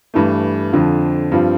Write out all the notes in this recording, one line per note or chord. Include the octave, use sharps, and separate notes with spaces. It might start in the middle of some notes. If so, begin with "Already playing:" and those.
G2 E3 A3
F2 D3 F3
G2 F3 C4 F4